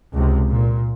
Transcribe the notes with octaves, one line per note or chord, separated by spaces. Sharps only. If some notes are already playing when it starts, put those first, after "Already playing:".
C#2 C3
A#2